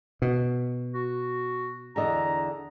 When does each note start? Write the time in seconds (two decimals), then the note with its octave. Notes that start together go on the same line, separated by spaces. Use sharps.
0.22 B2
0.94 F#4
1.96 E2 D3 D#5 A#5